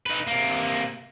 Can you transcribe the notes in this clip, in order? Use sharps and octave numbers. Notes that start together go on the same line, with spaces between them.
D#4 B4
C3 A#3